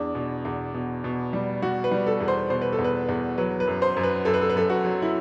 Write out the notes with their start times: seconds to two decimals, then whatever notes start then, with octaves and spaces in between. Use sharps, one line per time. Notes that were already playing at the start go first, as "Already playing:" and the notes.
Already playing: E2 D4
0.15 B2
0.45 E2
0.74 B2
1.04 B2
1.33 G3
1.62 G3 F#4
1.84 B4
1.91 G3
2.07 A4
2.20 E2
2.28 C5
2.50 B2 C5
2.62 B4
2.72 A4
2.79 E2
2.84 B4
3.09 E2
3.38 F#3 B4
3.60 B4
3.67 F#2
3.82 C5
3.97 F#2
4.03 B4
4.25 F#2 A4
4.34 B4
4.41 A4
4.50 B4
4.56 F#2 A4
4.70 F#4
4.85 F#3
5.02 E4